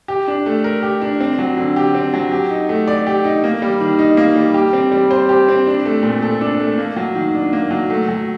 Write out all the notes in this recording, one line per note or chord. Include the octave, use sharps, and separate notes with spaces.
G4
D4
A3
A#4
G4
D4
C4
F#3
D3
G4
C4
F#3
G4
D#4
A3
D5
G4
D#4
A#3
G3
D#3
D#4
A#3
G3
G4
C4
G3
C5
G4
C4
D4
A3
A#2
A4
D4
A3
A#3
F#3
D#3
D4
A#3
F#3
A3
F#3